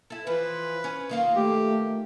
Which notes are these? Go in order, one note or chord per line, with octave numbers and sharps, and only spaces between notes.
E4 A4
E3 F3 B4
C#4
D#3 A#3 F4
A3 G4